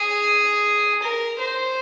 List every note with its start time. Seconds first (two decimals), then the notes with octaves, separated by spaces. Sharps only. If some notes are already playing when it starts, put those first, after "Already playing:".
Already playing: G#4
1.03 A#4
1.39 C5